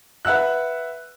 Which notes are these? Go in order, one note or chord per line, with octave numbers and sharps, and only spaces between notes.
B4 E5 F#5 E6 F#6